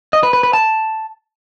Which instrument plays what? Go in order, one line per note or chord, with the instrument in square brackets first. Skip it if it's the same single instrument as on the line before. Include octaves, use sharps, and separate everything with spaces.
[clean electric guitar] D#5
B4
B4
B4
A5